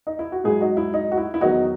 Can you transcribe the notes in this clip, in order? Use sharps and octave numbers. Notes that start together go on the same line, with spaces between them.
D#4
E4
F#4
G#2 F#3 E4 G#4
D#4 F#4
E4
D#4
F#4
E4
E4
E2 D#3 F#3 D#4 F#4